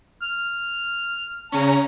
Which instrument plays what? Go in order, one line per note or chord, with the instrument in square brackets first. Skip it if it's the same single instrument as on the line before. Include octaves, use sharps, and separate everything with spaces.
[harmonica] F6
[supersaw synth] C#3 C#4 [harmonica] A#5